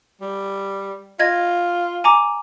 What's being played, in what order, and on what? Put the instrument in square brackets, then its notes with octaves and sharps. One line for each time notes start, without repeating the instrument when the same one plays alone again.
[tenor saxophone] G3
[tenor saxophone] F4 [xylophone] D#5 G#6 A#6
[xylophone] G#5 A#5 D6